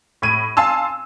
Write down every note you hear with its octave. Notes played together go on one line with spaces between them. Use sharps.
A2 G#6 D#7
F5 G#5 A5 C6 E6